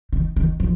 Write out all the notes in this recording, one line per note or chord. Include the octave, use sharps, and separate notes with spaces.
D#3
D#3
F3